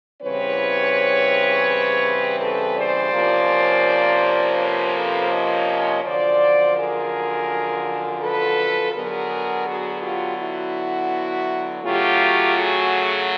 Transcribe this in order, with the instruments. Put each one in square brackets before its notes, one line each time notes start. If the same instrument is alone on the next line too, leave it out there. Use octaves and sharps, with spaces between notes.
[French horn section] E2 C#3 E3 G3 C4 B4 C#5
A4 B4
C5 D5
C3 F3 A#3 C#4
B4 C#5
A4 B4
C#5 D#5
F#2 D3 F3 C5 D5
G#4 A#4
A4 B4
D3 F#3 B3 G#4 A#4
F#4 G#4
F4 G4
E4 F#4
C#3 F#3 A3 F4 G4
F#4 G#4